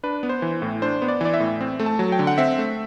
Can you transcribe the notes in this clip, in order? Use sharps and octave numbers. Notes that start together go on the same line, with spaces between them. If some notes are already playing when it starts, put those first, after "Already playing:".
D4 B4
B3
C5
E3
A2
D4 C5
B3
D5
E3 D5
E5
A2
C4
A3
A5
F#3
G5
D3
F#5
C4 E5
A3